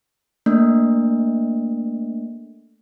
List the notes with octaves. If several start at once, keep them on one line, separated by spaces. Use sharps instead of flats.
A3 A#3 D4